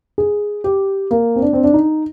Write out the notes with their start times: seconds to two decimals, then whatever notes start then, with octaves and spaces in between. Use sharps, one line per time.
0.18 G#4
0.64 G4
1.11 A#3
1.36 C4
1.42 D4
1.53 C4
1.64 D4
1.74 D#4